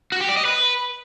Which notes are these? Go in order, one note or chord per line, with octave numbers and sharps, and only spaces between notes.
F#4
G4
D5
D#5
B4